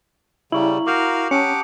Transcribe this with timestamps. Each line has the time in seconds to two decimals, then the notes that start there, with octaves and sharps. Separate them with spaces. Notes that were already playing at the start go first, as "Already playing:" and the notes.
0.52 C#3 G3 E4 A#5 C#6 F#7
0.87 F#4 A#4 F5 D6 G6 F7
1.31 C#4 G4 F#5 A5 D6 D#6 C#7